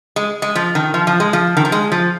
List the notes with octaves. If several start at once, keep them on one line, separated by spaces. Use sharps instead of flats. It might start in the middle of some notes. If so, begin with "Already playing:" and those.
G#3
G#3
F3
D#3
F3
F3
G#3
F3
D#3
F3
G#3
F3